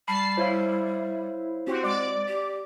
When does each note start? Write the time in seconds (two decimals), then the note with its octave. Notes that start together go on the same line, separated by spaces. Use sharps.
0.08 G3 A5 B5 C7
0.37 E4 C5 C#5 F5
1.67 C4 F#4 G4
1.83 G#3 D5 D6
2.28 G4